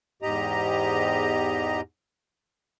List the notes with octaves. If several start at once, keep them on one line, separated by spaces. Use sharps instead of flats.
E2 G#2 G4 D#5 A#5